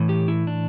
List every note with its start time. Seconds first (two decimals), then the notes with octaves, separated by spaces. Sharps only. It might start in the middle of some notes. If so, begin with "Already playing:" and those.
Already playing: A2 E3
0.09 G4
0.28 E4
0.47 D4